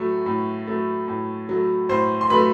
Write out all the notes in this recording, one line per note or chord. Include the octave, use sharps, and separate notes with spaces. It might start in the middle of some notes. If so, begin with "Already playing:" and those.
Already playing: A2 F#3 A3
A2
F#3 A3
A2
F#3 A3
A2 C5 C6
C6
F#3 A3 B4 B5